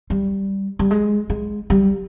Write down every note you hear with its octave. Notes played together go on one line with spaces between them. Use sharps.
G3
G3
G#3
G#3
G3